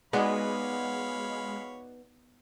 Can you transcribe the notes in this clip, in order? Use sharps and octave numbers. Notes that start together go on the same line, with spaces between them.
G#3 B3 D#4 F#4 C#5 D5 F5 B5